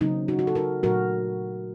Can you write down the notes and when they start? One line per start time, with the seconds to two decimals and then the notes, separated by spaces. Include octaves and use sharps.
0.01 C#3 F#3 A#3 C4 D#4
0.28 D#4 F#4
0.39 F#4
0.47 A4
0.55 F#4 A#4
0.83 A#2 F#3 A3 F#4 A#4